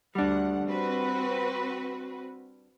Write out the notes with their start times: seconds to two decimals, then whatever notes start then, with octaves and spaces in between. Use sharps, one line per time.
0.15 D2 G3 D4 F#5
0.67 C4 F#4 B4